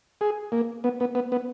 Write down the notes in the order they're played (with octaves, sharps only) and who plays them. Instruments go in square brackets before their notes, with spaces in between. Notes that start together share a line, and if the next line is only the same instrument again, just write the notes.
[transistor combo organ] G#4
A#3
B3
B3
B3
B3